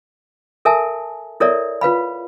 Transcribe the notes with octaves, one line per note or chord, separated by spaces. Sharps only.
A4 A#4 E5 G#5 A5
E4 A4 A#4 C#5 D5 E5
F4 B4 F5 B5